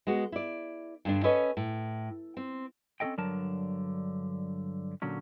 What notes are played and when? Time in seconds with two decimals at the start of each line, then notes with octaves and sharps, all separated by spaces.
0.07 G#3 B3 F#4
0.32 E4 D5
1.05 G2 D3 D4
1.24 C#4 A4 B4 C#5 D#5
1.57 A2
2.37 C4
3.00 C4 C#4 D#4 A4 D#5 G5
3.18 G2 D3 F#3 A#4 A5
5.02 A#2 D3 F#3 C#4